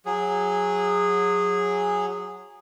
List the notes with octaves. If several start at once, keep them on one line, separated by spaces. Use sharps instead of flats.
F#3 G#4